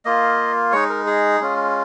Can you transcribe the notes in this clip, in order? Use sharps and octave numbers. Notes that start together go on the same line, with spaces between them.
A#3 F4 D#5
G#3 D#4 C#5
A#4
G#4
G#3 C#4 F4